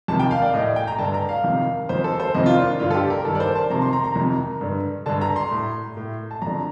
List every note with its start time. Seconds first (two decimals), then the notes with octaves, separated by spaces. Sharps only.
0.08 F2 C3 D#3 A5
0.20 G5
0.31 F5
0.42 D5
0.54 A2 D#5
0.76 G5
0.87 A#5
0.98 G2 D3 A5
1.14 A#5
1.29 F5
1.44 F2 C3 D#3
1.89 F2 D#3 C5
2.04 A4
2.20 C5
2.34 F2 C3 D#3 D#5
2.46 F4
2.57 D4
2.80 G2 D3 F4
2.90 A4
2.95 G4
3.10 A#4
3.25 G2 D#3 A4
3.35 D5
3.40 C5
3.55 A5
3.70 F2 C3 D#3 A#5
3.82 C6
3.93 A#5
4.04 A#5
4.16 F2 C3 D#3
4.61 G2 D3
5.06 G2 D3 A5
5.21 A#5
5.36 C6
5.51 A2
5.97 A2
6.31 A5
6.42 F2 D3 A#5